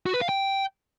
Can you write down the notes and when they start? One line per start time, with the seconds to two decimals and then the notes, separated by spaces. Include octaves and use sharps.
0.06 F#4
0.14 B4
0.21 F5
0.29 G5